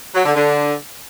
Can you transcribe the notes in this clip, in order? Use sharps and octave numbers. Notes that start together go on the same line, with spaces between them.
F#3
D3
D3